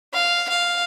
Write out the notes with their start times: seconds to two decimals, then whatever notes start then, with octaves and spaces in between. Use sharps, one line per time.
0.14 F5
0.50 F5